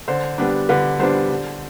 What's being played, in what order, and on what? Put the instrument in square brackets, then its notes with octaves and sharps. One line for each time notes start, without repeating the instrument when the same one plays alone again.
[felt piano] D3 C5
G3 B3 D4
D3 B4
G3 B3 D4 C5
D3